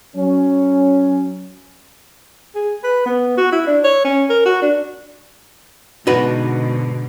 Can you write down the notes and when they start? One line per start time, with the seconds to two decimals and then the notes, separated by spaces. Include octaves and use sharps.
0.16 F#3 C#4
2.55 G#4
2.84 B4
3.06 B3
3.37 F#4
3.52 E4
3.67 D4
3.84 C#5
4.05 C#4
4.30 A#4
4.46 F#4
4.62 D4
6.07 G#2 B2 D3 D#4 F#4 B4